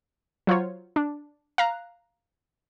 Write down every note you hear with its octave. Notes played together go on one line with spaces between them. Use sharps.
F#3 F4 C5 C#5
D4
F5 A#5 F#6